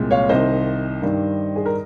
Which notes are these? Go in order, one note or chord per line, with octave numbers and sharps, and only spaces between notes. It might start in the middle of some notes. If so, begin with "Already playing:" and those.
Already playing: C2 A#2 G#3 C4
C#5 F5
C2 C3 D#3 C5 D#5
G2 D#3 G3
G#4
A#4